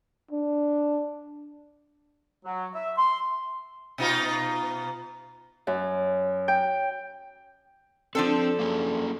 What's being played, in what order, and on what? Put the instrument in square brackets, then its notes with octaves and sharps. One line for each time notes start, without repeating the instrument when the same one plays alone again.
[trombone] D4
[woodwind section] F#3
E5
C6
[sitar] B2 D#4 F4
[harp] F#2
G5
[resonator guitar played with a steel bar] F3 D4 A4 [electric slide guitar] C4
[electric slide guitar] A#3 C#4 G#4